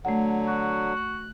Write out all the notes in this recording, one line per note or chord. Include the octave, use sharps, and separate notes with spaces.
D3 F#3 A3 F#5
F#4
F#6